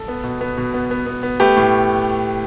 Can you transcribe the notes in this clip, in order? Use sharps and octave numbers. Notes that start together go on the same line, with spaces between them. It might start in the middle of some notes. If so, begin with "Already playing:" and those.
Already playing: A4
B3
B2
B3
B2
B3
B3
B3
B3
A3 G4 B4
A2